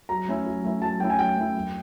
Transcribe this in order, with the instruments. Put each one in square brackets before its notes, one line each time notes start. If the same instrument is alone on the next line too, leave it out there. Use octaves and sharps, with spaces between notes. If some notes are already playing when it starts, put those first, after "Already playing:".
[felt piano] F#3 [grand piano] A#5
[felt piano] A3 C#4 E4
F#3
A3 C#4 E4
[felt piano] F#3 [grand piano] A5
[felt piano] A3 C#4 E4 [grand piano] G5
[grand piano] G#5
[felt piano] F#3 [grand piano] G5
[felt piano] A3 C#4 E4
F#2